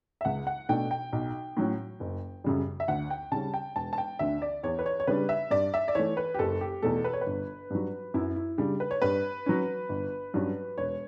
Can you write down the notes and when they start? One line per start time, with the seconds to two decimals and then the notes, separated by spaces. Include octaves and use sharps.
0.21 E5
0.25 C#2 F#5
0.47 F#5
0.69 B2 A3 D4 G5
0.91 G5
1.12 B1
1.57 A2 F#3 C#4
2.00 F#1
2.44 F#2 C#3 G3
2.80 E5
2.88 D2 F#5
3.10 G5
3.32 C#3 G3 C#4 A5
3.54 G5
3.75 E1 A5
3.93 A5
3.98 G5
4.19 D2 D3 E5
4.42 D5
4.63 E2 C#5
4.79 B4
4.86 C#5
5.00 C#5
5.07 C#3 G3 D4 B4
5.29 E5
5.51 G2 D5
5.74 E5
5.88 D5
5.95 E3 A3 C#5
6.17 B4
6.34 G4
6.39 F#1 A4
6.61 G4
6.82 E2 B2 A3 A4
7.04 B4
7.13 C#5
7.21 G1 B4
7.70 G2 F#3
8.14 F#2 E4
8.36 E4
8.58 C#3 G3 D4
8.80 B4
8.91 C#5
9.02 G2 B4
9.46 F#3 C#4
9.89 G1
10.34 G2 F#3 C#4
10.78 E1 C#5